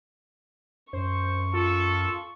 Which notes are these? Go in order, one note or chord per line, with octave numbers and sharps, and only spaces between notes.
F#2 C5 C#6
F4 A4